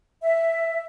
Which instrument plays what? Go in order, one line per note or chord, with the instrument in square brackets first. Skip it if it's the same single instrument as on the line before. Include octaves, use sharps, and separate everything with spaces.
[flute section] E5